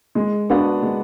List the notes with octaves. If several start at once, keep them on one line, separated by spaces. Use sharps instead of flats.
G#3
B3 D4 F#4 B4
G#3